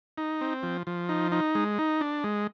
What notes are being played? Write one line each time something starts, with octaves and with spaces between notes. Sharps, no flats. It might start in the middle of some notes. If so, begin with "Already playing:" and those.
D#4
C4
F3
F3
D#4
D#4
G#3
D#4
D4
G#3